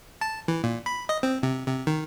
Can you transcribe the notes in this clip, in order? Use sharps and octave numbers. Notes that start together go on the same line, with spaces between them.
A5
E3
A#2
B5
D#5
C4
C3
C3
D#3